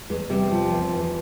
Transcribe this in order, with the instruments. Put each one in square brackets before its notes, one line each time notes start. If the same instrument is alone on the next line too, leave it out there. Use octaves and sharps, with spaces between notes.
[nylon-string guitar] E2 G#3
C3 G3
F3
E2
E2